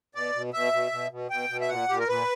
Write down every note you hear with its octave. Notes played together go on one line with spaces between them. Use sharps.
B2 D5
B2
B2 E5
B2
B2
B2
B2 G5
B2
E5
A#2 F#5
A#2 G4
A#4
A#2 B4